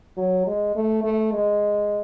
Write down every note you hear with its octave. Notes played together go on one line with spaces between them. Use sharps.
F#3
G#3
A3
A3
G#3